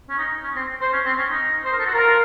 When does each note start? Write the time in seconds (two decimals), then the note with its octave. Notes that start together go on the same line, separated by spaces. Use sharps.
0.09 C#4
0.18 D#4
0.44 C#4
0.56 C4
0.81 C5
0.93 C#4
1.06 C4
1.18 C#4
1.30 D#4
1.65 C5
1.73 A#4
1.79 A4
1.86 F#4
1.93 F4 A#4
2.06 F4